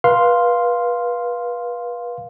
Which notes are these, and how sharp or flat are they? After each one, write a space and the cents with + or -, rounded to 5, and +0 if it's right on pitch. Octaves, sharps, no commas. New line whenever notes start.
B4 -30 F5 +0 C6 +0